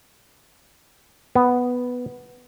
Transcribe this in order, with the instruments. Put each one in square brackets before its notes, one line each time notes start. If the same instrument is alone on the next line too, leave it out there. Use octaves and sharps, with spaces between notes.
[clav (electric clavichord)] B3